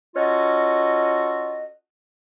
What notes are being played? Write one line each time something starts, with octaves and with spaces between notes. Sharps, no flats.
C#4 F4 F#4 A4 D#5